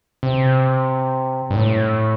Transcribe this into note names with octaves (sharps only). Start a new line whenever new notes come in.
C3
G2
A2